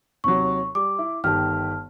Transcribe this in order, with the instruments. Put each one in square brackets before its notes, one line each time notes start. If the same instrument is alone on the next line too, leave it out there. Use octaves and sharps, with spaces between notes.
[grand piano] D#2 C3 F#3 [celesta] C#6
[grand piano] G3 [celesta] D6
[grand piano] E4
[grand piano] G1 D#3 G4 [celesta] A5 F6